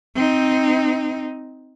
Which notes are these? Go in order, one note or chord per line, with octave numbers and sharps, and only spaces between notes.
C4 D#4